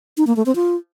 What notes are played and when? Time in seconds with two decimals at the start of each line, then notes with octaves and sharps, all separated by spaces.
0.17 D#4
0.27 A#3
0.36 A3
0.46 C4
0.55 F4